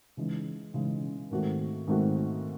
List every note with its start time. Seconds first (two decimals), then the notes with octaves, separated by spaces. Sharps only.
0.17 C#3 E3 G#3 D#4
0.74 C#3 E3 G#3 D#4
1.31 G#2 D#3 A3 C4 F#4
1.88 G#2 D#3 A3 C4 F#4